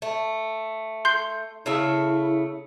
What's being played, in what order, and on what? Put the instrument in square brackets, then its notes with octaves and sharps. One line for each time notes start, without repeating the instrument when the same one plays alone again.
[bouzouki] A3
[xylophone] C6 G6 C7
[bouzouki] C#3 A3 E5 [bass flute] E4